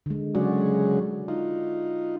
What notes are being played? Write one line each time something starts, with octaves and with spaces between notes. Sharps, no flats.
D3 G#3
C#3 F#3 G#3 F#4 D5
D#4 F4